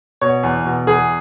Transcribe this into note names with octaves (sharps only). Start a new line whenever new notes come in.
B2 C#5
E2
B2
E2 G#4